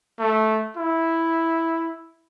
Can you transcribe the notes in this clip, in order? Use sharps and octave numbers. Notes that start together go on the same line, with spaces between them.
A3
E4